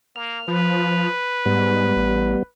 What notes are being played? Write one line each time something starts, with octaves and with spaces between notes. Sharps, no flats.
A#3 F6
F3 B4
G#2 G3 B3
A1